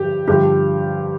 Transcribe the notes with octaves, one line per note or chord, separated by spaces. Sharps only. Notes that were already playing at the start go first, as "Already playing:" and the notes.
Already playing: G2 D3 F3 G4
G2 D3 F3 G4